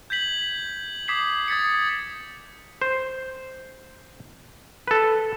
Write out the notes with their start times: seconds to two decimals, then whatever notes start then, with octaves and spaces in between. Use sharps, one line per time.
0.10 G6 G#6 B6 F#7
1.08 D6 D#6 G#6 B6 C7 F#7
1.48 D#6 G#6 A6 B6 C#7
2.82 C5
4.88 A4 B4